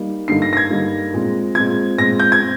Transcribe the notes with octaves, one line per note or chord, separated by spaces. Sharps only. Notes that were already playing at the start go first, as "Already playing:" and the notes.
Already playing: G3 A#3 D#4
G2 D3 G3 A#3 D#4 C7
A#6
A#6
G#6
G2 D3 G3 A#3 D#4
A#2 G#3 C4
A#2 G#3 C4 G#6
A#2 G#3 C4 A#6
G6
G#6
C4